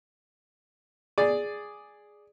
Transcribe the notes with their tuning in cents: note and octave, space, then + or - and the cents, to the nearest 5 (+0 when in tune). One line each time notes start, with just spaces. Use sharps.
G#4 +0 D5 +0